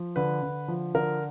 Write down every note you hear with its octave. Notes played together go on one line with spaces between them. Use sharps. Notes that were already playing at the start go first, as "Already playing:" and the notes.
Already playing: F3
D3 B4
D3
F3
D3 A#4